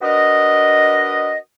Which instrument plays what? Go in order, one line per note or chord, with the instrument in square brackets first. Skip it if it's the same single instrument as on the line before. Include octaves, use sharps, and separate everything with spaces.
[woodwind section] D4 F#4 A#4 B4 D#5